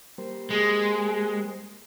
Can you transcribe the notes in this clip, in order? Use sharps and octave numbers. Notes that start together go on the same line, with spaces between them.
G3 A#3 C5
G#3